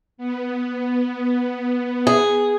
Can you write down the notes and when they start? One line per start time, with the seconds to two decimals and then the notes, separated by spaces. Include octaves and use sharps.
0.17 B3
2.07 G#4